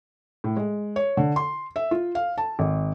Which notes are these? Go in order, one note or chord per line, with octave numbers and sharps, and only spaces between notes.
A2
G#3
C#5
D3
C6
E5
F4
F5
A5
G#1